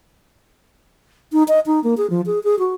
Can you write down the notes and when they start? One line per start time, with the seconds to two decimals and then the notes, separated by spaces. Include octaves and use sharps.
1.33 D#4
1.48 D#5
1.66 D#4
1.84 A#3
1.97 G#4
2.10 F3
2.26 G#4
2.44 G#4
2.59 F#4